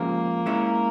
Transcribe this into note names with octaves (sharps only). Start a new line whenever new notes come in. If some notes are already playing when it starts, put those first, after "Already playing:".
Already playing: F3 G#3 A#3 C#4 G4
G#3 C#4 E4